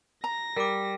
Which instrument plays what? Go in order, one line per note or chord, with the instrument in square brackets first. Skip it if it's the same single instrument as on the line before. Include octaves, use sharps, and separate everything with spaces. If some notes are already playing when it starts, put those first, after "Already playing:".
[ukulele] A#5 [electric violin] A#6
[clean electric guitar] G3 [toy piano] A#4 D6